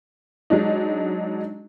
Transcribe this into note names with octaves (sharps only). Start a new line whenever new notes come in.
F#3 G#3 D4 D#4